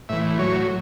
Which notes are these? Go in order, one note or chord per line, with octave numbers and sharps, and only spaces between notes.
A2 E3 E5
A2 F#3 C#5